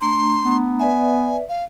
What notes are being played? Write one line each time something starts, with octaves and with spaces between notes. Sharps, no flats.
A3 D4 A#5 C6
B3
B4 D5 E5 G#5
F5